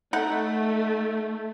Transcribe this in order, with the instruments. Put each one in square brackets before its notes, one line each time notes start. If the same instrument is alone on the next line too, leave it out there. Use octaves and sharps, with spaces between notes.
[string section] A3 [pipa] D#4 F#5